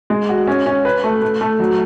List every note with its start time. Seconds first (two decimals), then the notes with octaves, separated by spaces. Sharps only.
0.10 G#3
0.29 F#4
0.47 C#4
0.66 C#4
0.85 B4
1.04 A3
1.22 A3
1.41 A3
1.60 F#3